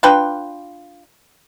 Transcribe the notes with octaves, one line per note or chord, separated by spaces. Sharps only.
D4 F4 B4 G5